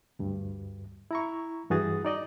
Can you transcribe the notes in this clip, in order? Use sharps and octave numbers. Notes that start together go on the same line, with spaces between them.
D2 G2
E4 A#5 C#6
G2 E3 F#4 G#4 D#6 A6
D#4 D5 D#5